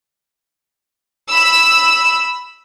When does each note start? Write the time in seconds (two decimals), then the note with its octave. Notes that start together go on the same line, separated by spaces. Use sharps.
1.29 B5 E6